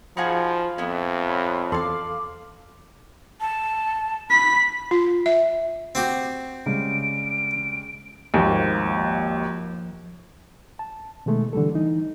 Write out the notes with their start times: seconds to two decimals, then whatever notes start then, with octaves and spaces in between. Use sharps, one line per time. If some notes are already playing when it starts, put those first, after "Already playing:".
0.17 F3 D#4 F#4 G#4 F5 B5
0.78 F2 B3 E4
1.30 C#5 B5
1.72 E2 A4 D5 F5 C6
3.41 A5
4.30 B5 B6
4.91 F4
5.26 E5
5.95 C4 F#4 G4
6.66 C#3 G3 G#3 D7
8.34 G#1 D#2 F3 A#3
10.79 A5
11.26 B2 D#3 G#3 A3
11.53 D3 E3 G3 A4
11.75 E3 D#4